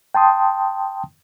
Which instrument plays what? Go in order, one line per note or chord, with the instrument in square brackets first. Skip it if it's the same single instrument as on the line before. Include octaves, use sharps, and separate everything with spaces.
[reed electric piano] G5 A5 C6 D#6